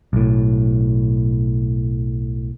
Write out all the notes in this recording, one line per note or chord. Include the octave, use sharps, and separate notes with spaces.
B1 A2